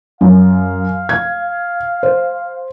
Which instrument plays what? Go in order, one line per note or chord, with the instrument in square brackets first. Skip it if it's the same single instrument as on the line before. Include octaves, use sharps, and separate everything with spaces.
[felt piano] F#2 [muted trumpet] F5
[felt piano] G#6
C5